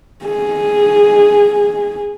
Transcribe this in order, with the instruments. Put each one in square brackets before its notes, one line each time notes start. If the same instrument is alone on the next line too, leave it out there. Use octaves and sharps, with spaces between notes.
[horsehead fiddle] G#4